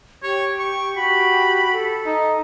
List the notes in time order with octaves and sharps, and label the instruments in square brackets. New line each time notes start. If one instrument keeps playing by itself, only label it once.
[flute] G4 [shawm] C#5
[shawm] C#6
[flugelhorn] F#4 [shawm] B5
[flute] A4
[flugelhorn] D#4